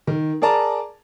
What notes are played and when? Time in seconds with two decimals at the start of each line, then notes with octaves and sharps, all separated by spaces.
0.07 D#3
0.42 G#4 A#4 D5 A5 A#5